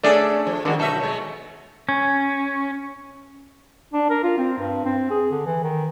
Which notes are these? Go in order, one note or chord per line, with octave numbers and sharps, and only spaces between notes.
A3 C#4 D4 G#4 A4 D5
F3
D3 D#3 G#3 F#4
B1 D#4 F#4 A4 E5
F#3 G#3
C#4
D4
A#4
F4
C4
G2
C4
G#4
D3
E3
D#3